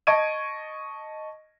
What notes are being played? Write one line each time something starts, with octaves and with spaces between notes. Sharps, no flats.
D#5 A5 C#6 G#6 D7 D#7